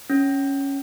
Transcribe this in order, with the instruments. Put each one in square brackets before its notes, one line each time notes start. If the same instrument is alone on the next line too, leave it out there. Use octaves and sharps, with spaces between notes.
[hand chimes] C#4